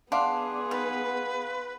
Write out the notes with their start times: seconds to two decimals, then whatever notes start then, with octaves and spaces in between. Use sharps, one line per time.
0.12 B3 D4 G#4 F5 F#5 C6
0.71 D#3 B4